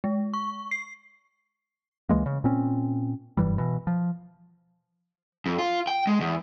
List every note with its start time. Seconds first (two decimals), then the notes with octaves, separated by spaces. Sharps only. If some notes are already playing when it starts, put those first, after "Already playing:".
0.04 G#3
0.34 C#6
0.71 C7
2.09 C#2 E3 G#3 A#3
2.26 C#3
2.44 A#2 C4 C#4
3.37 F#1 G2 E3 G3
3.58 B2 E3
3.87 F3
5.46 F2
5.58 F4
5.87 G5
6.07 G#3
6.21 E2